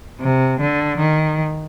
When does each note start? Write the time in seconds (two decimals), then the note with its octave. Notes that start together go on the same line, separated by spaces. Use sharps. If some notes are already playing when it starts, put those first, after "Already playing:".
0.21 C3
0.61 D3
0.99 D#3